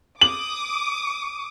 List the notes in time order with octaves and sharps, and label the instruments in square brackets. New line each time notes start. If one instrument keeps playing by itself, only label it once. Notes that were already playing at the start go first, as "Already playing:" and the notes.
[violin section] D6 D#6 [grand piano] F#7